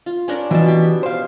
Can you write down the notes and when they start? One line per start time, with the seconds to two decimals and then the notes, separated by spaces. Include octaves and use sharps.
0.06 F4
0.28 C#4 D4 A#4
0.51 B2 E3 A5
0.68 G4
1.03 C5 F5